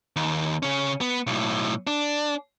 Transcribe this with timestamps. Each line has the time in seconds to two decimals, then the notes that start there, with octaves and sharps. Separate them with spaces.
0.16 D#2
0.63 C#3 C#4
1.01 B3
1.27 B1 A2
1.87 D4